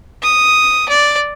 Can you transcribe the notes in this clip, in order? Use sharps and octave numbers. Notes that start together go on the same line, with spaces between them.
D#6
D5